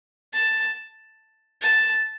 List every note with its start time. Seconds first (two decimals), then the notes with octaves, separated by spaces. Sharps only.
0.34 A5
1.62 A5